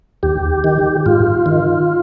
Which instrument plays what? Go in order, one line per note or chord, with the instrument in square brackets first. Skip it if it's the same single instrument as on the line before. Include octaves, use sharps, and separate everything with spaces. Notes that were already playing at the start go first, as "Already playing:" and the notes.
[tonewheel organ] D#2 G4
D#3
G#2 F4
D#3